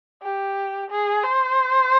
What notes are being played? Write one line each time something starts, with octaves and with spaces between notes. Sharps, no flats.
G4
G#4
C5